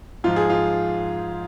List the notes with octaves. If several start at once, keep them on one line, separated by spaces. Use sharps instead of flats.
G#2 F3 F4
G#4
F4